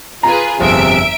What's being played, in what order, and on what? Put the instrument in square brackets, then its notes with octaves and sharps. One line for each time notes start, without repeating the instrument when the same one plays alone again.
[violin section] F4 G#4 B4 [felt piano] A#5
[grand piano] G1 F2 G#4 [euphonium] C3 [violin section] E5 D7